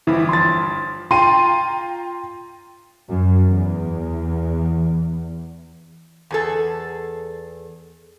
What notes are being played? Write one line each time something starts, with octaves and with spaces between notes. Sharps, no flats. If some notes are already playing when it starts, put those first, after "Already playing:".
G1 E3 F3 B5
C6 A6
F4 G5 A#5 C6 D#7
F#2
E2
E2 G#4 A4